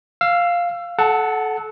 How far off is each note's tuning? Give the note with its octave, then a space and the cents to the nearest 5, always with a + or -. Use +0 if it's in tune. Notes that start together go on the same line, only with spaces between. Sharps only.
F5 +0 E6 +25
A4 -25 F#5 +0 A5 +20